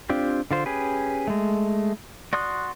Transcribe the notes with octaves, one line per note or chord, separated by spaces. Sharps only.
C4 D4 F4 G4
D3 F4 C5
C#4 G4 G#4 B4
G#3 A3
F#4 D5 C6 D#6 F#6